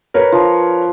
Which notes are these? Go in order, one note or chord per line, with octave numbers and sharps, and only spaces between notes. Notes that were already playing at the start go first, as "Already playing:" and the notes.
A#4 B4 C#5
F3